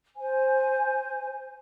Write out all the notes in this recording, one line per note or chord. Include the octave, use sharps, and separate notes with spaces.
C5 G#5